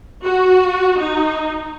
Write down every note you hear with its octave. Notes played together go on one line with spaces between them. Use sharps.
F#4
D#4